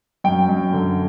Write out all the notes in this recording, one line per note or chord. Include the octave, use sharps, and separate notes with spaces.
F#2 G5
F#2
D3